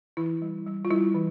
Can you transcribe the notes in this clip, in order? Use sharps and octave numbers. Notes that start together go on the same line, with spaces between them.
E3 E4
G3
G3
F4
G3 E4
E3